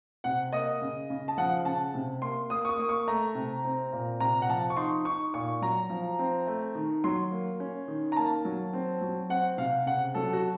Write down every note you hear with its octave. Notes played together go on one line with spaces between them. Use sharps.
C3 F#5
A#3 D#5
C#3
C#3
A5
F3 F#5
C#3 A5
C3
A#3 C6
A#3 D#6
C#6
D#6
A#3
C#6
A3 A#5
C3
C4
A#2
C3 A#5
F#5
F3 A5
C#6
D#4 C6
D#4 C#6
A#2 C#6
F#3 A#5
F3
C4
A3
D#3
F#3 C6
A#3
C#4
D#3
A#5
A#3 A5
F#3
C4
F#3
C4 F#5
C3 F5
C#3 F#5
F#3 A4
F#4